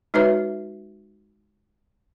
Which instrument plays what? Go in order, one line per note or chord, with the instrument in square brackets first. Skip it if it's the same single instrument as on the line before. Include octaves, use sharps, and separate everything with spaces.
[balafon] G#3 D#4 F#4 B4 C#5 E5